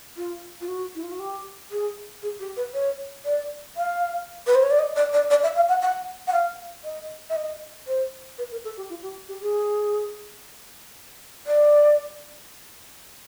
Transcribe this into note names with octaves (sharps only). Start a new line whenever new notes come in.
F4
F4
F#4
E4
F4
F#4
G4
G#4
G#4
G4
B4
C#5
D5
F5
B4
C5
C#5
D5
D#5
D5
D5
D5
E5
F5
F#5
F#5
F#5
F5
D#5
E5
D#5
C5
B4
A#4
A4
G4
F4
G4
G4
G#4
D5